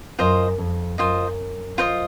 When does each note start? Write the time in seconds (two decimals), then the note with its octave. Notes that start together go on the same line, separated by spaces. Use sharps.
0.19 F#2 F4 C5 D#5
0.58 F2
0.98 F#2 F4 C5 D#5
1.78 F4 C5 D#5